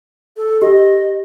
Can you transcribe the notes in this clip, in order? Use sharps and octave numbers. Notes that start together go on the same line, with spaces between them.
A4
G4 D#5